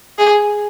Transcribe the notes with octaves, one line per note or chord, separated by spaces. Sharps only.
G#4